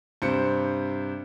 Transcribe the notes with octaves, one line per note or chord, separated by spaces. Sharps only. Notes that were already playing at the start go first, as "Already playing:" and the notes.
G2 C3 C5 C#7